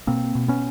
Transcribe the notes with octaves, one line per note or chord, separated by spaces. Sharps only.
B2 A#3 C4
B2
B3 C#4